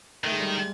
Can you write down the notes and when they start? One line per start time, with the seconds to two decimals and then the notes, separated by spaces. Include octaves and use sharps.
0.24 D#3 A3
0.32 G#3
0.39 G3 A3